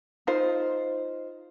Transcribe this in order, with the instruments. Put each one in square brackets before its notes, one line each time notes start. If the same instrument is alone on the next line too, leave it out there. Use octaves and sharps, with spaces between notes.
[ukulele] D#4 F4 C5